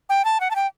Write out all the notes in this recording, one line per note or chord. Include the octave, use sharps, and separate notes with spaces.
G5
A5
F#5
A5
G5